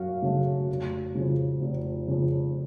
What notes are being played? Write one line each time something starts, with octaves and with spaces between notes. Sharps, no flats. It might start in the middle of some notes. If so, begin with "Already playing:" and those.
Already playing: F#2 F#3 F#4 F5
C#3 F#3 A3
F1
F2 C#3
F1
F2 C#3